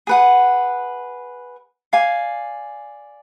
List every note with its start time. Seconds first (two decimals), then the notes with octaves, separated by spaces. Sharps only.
0.07 G#4 B4 F#5
1.93 D5 F5 G#5